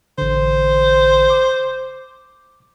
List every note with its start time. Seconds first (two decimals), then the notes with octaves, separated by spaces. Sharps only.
0.18 A1 D3 C5
1.30 D6